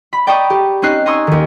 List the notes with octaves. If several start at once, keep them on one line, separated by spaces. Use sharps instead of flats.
B5
D5 G5 A#5 B5 C#6 D#6
G4
C4 C#4 D#4 F#6 C7
G#5 A#5 C6 C#6 D#6 E6
D#2 D#3